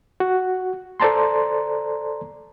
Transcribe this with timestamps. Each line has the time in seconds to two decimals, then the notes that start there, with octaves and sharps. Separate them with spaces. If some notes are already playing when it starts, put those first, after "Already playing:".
0.20 F#4
1.00 A4 C5 D5 A5 A#5 C6